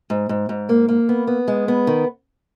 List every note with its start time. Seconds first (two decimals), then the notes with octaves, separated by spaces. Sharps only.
0.10 G#2
0.29 G#2
0.49 G#2
0.69 A#3
0.88 A#3
1.09 B3
1.27 B3
1.48 G#3
1.68 B3
1.87 D#3